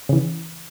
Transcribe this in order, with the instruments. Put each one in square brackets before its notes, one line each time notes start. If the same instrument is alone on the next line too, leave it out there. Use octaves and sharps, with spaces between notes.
[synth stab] C#3 E3